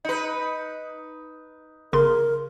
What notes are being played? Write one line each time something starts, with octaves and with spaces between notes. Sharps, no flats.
D#4 B4
G1 C#3 A#4 C6